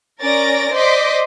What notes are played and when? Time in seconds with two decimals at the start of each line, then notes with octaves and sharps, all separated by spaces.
0.20 C#4 A#4 D5 A6 A#6 D7
0.73 C5 D5 D#5 C6 D6 B6